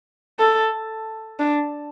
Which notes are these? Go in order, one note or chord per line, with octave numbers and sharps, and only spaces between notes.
A4
D4